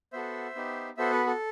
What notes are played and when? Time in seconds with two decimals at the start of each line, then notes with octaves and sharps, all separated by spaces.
0.13 B3 F#4 A4 C5 E5
0.55 B3 D#4 G4
0.97 B3 F#4 A4 C5 E5
1.12 B4
1.27 A4